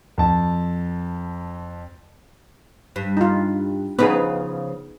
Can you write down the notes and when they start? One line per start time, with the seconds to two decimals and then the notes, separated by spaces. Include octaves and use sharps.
0.18 F2 A5
2.96 G2
3.17 D#4 F4
3.99 C#3 F3 B3 D#4 G#4 B4